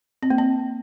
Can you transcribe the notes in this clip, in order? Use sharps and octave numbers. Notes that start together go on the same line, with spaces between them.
C4
A#3
C4